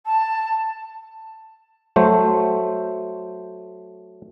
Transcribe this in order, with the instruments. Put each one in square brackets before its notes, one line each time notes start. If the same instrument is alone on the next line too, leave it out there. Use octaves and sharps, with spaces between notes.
[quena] A5
[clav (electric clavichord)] F#3 A3 C5